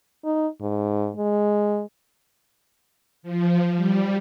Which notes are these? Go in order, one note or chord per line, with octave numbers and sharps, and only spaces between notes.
D#4
G#2
G#3
F3
G3